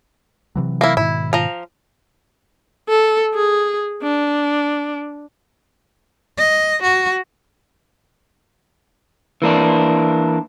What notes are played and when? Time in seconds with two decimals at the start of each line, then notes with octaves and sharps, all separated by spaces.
0.56 C3 E3 F#3
0.81 A#3 E4
0.97 G#2 B2 D#3 E4
1.33 F3 A#5
2.89 A4
3.34 G#4
4.03 D4
6.38 D#5
6.83 F#4
9.42 E3 A#3 D4